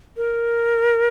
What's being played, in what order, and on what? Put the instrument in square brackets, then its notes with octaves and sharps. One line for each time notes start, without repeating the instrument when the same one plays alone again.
[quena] A#4